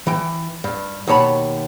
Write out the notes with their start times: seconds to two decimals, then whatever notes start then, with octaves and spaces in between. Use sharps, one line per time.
0.07 E3 G5
0.64 G2
1.07 D#2 B2 C#5 A5 B5